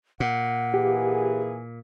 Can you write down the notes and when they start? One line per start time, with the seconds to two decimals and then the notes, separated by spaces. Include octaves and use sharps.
0.20 A#2 F#5
0.74 E3 A#3 G4 G#4